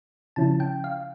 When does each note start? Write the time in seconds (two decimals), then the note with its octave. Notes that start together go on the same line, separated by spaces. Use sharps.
0.36 C#3 F3 C#4 E4 A5
0.60 G5
0.84 F5